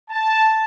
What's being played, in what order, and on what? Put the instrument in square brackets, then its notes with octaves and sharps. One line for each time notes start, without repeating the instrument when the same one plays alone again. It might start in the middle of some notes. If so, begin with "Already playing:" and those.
[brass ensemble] A5